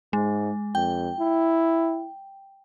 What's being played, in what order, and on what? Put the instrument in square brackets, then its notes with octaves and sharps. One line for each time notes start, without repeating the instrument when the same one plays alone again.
[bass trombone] G#2 [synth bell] G#3
[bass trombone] F2 [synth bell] G5
[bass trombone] E4